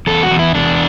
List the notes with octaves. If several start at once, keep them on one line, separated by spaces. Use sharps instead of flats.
E2 A4
F#4
E2
E4
E2 D4